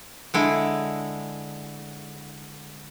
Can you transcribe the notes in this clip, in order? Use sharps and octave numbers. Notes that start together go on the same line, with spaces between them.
D3 G#3 E4